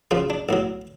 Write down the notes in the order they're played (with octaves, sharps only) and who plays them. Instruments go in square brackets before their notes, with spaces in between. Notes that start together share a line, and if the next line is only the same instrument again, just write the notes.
[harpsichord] F#2 C#3 F3 F4
D4
B1 A2 F#3